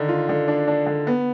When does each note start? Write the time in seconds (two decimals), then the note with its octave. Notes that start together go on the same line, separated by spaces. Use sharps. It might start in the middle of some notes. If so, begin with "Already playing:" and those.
Already playing: D3 D#3
0.09 F4
0.29 D3
0.48 D4
0.68 D4
0.86 D3
1.07 B3